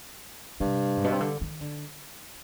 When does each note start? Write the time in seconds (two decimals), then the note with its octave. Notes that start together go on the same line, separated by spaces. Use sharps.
0.60 G2 C3
0.97 G#2
1.04 B2
1.12 C3
1.20 D3
1.41 D#3
1.61 D3